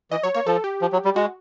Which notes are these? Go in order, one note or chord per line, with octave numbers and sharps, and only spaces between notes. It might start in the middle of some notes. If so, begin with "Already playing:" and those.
E3 D#5
F#3 C#5
A#3 C#5
F3 A4
G4
F3
F#3
G3
G#3 F#4